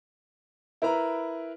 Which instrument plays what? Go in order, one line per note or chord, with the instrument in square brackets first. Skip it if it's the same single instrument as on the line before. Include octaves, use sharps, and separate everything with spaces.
[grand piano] E4 A#4 B4 A#5